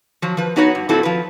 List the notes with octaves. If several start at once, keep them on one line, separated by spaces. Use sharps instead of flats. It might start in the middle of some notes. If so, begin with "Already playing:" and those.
F3 F#3
F3 B4
B3 D#4 F#4 B4 C#5 F#5
G2
A#2 F#3 C4 E4 F#4 A4
F3 B4